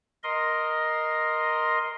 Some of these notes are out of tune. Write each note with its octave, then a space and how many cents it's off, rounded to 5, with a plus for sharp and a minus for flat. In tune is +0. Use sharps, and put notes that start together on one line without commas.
A#4 +5 D#5 +0 C6 +0